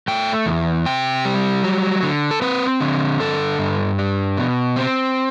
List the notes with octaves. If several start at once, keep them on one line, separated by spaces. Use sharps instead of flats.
A3 G5
E2
C3 G5
G3
F#3
D3
A4
C4 B4
D3
G2 A4
G2
D4
B2
C4